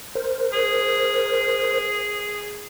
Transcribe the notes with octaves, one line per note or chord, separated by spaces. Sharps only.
A#4 C5
G#4